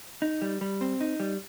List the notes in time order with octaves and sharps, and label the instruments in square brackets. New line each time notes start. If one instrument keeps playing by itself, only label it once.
[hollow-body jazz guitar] D#4
G3
G3
C4
D#4
G3